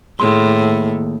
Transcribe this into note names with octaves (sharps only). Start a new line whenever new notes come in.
D#2 A2 G#4 C6